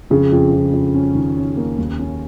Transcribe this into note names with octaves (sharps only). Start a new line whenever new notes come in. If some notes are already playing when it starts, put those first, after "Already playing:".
F2 C#3
F2
F2
F2
C#4
D#3
C#4
A#3
D#2
C#4